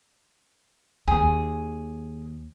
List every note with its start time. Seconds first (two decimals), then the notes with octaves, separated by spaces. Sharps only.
1.08 D#2 G#4